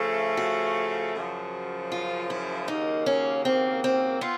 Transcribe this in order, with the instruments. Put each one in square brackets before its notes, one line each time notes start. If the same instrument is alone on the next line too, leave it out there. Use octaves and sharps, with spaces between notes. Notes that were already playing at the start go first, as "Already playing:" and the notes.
Already playing: [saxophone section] C#3 F3 A3
[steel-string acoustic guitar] F#4
[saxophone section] F#2 C#3 F3
[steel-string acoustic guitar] F4
E4
[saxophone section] D#2 C#3 F#3 A#3 [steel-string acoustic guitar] D#4
[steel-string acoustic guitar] C#4
C4
C4
[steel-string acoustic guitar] B3 [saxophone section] C4 F4